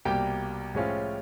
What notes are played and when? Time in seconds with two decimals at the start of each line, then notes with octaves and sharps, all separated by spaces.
0.05 C2 B2 G3 A#3 G4 G5
0.75 A2 F3 G#3 C#4 F4